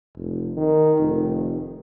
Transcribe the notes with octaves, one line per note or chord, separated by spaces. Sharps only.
F1
D#3
F1